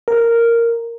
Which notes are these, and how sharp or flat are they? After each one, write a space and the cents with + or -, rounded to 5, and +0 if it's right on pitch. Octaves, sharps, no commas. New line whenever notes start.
A#4 -5